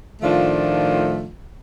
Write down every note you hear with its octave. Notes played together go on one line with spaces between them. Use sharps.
A2 D#3 F3 A3 D4 F4